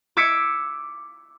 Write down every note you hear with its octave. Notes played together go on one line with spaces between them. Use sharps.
D6 E6 G#6 B6 C#7 D7